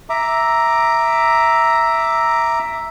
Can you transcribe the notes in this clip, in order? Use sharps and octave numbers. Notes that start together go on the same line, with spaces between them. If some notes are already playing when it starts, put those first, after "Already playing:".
E5 A#5 D6